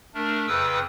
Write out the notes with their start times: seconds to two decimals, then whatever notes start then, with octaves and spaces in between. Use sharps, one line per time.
0.14 A3 D4 A#4
0.47 F2 C#3 B4 G5 D#6 E6